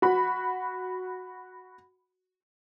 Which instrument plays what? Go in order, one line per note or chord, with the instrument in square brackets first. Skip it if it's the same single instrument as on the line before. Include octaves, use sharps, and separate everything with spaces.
[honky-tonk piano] F#4 B5